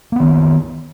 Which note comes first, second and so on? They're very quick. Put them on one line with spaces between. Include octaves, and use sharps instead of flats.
A#3 B3 D#3